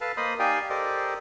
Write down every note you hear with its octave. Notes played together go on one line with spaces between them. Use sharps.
A4 B4 F5 A5
A#3 C5 D#5 B5 C6 D#6
D#4 G4 D5 F5 G5 G#5
G4 A4 A#4 C5 D5 D#5